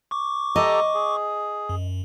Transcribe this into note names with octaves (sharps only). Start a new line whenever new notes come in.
C#6 D6
G4 A4 D#5 A#5
G#4
F#2